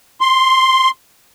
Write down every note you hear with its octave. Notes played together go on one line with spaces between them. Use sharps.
C6